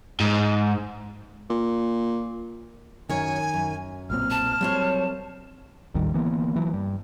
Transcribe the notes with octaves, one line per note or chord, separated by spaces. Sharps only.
G#2
A#2
F#2 D#3 C#5 G#5
F#2
B1 A#2 C4 F6
A5
F#3 G3 C4 C5 C#5
A1 D#2 D#3 G3
D3 E3 A#3 B3
E3 F#3
G2